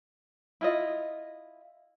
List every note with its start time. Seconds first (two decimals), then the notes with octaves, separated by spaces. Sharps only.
0.61 E4 F4 D#5